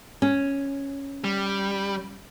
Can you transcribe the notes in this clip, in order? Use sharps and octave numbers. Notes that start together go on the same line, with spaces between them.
C#4
G3